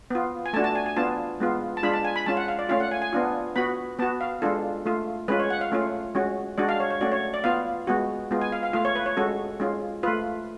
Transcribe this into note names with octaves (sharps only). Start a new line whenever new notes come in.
B3 F4
G#5
A3 D4 F#4 A5
A5
G#5
G#5
B3 D4 F4 A5
G#3 B3 F4
A5
G#3 D4 F4 B5
A5
G#5
B5
G#3 C#4 F4 A5
F#5
F5
D5
A3 C#4 F4 F5
F#5
G#5
G#5
B3 D4 F4
B3 F#4 B5
B3 F#4 A5
F5
G#3 D4 F4 A4
A3 F4
G#3 C#4 F4 B4
C#5
F#5
F5
A3 C#4 F4
G#3 C#4 F#4
G#3 D4 F#4 D5
F5
C#5
C#5
A3 C#4 F#4 D5
C#5
D5
B3 F4 F5
G#3 B3 F#4
G#3 B3 F4
G#5
F5
F5
A3 F4 F5
C#5
B4
C#5
G#3 C#4 F#4 A4
G#3 C#4 F4
A3 F4 B4